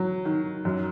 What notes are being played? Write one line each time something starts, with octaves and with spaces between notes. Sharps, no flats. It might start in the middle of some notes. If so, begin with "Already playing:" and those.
Already playing: F#3
D#3
F#2